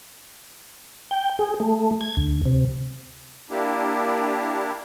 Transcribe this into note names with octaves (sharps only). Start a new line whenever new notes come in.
G5
G#4
A3
G#6
D2
C3
A#3 D4 E4 G4